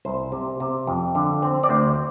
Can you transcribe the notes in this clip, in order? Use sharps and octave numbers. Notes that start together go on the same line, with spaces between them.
C2 C5
C3
C3
F2
D3
C4
D5
D2 C5